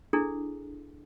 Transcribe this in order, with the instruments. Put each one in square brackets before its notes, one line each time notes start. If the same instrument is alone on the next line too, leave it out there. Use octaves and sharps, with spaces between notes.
[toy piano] D4 E4 G#4 A4